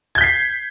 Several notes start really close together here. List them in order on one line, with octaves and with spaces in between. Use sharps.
G#6 G6 B6 C7